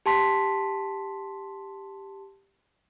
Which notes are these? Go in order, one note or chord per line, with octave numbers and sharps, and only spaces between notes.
G4 A5 C6 B6